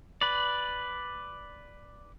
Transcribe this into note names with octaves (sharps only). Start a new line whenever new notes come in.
B4 D5